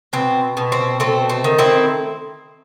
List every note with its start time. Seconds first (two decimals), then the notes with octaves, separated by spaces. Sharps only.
0.13 B2 C4
0.57 B2
0.72 C4
1.00 A3 C4
1.29 C4
1.44 D#3
1.58 C4 E4